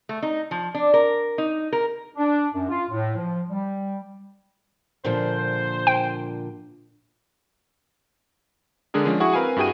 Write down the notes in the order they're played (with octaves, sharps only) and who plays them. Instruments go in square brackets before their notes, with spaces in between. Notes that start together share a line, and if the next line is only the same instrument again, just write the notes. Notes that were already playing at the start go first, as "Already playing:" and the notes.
[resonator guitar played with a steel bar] A3
D#4
F3
D4
A#4
D#4
A#4
[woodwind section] D4
F#2
F4
A2
F3
G3
[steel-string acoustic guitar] A#2 D3 F3 [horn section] C5
[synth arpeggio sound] G5
[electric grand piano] D3 G#3 D4 G#4 A#4
F3 G#3 C#4 D4
E4 F#4 G#4 F#5 C#6 D#6
C4 A#4 B4 F5 G#5
G2 E4 F#4 G#4 G5 D#7